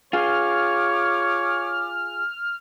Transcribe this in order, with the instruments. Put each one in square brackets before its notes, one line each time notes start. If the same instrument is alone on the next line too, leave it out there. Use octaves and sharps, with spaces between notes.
[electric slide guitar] F4 G#4 [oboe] C#5 [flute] D6 [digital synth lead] F6